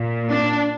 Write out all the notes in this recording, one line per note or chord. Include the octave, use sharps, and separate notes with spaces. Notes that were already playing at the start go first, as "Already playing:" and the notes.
Already playing: A#2
D4